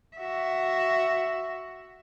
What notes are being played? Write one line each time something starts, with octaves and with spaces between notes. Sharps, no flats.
F#4 E5